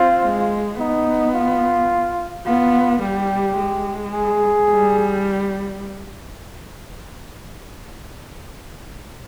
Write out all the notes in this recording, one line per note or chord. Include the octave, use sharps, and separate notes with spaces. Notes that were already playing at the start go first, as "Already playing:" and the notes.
Already playing: C4 F4
G#3
B3 D#4
F4
B3 F4
G3 G4
G#3
G#4
G3